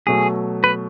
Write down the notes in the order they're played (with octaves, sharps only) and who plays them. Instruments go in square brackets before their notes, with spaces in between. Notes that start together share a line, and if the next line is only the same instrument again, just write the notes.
[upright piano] B2 F#3 A3 [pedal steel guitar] G#4
[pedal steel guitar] B4